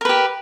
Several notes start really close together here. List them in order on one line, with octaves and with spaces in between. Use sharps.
A#4 B4 G4